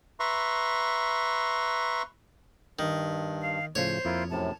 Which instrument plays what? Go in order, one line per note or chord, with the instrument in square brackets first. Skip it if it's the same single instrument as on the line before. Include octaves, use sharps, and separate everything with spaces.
[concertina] B4 E5 A#5 C6 C#6
[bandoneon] G2 [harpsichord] D#3
[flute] F5
[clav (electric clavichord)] A2 C#3 F3 [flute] C5 [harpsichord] C#5
[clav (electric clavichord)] F2 [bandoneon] A#3 E4 F4
[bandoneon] F#2 A2 C3 [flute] A5